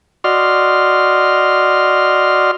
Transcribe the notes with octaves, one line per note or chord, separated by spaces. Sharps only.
F#4 D5 D#5 C6 F6